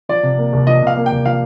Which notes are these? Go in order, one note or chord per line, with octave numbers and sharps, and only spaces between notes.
F3 D5
C3
A#3
C2
F3 D#5
C3
F5
A#3
G5
C2
F3 F5